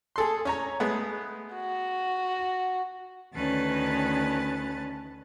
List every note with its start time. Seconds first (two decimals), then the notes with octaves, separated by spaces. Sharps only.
0.16 G#4 A4 C6
0.45 C#4 C#5 A#5
0.80 G#3 A3 B3
1.54 F#4
3.34 D2 D#3 C#4 B4 A5 A6